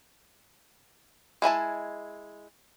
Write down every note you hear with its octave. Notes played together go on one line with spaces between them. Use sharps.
G#3 E4 G#5 A5